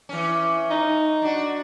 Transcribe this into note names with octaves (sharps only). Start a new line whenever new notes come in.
E3 C#4
D#4
D4 F#4